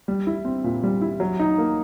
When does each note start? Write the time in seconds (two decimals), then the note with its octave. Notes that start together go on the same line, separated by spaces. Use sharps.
0.08 G3
0.27 E4
0.45 C4
0.64 A#2
0.83 G3
1.01 E4
1.20 F#3
1.40 D#4
1.58 A#3